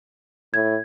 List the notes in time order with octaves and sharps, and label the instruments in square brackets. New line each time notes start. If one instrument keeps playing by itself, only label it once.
[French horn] A2 [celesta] G#6